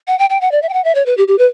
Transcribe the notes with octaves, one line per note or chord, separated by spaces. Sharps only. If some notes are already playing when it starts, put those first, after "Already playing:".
F#5
G5
G5
F#5
D5
E5
G5
F#5
E5
C#5
B4
G4
G4
B4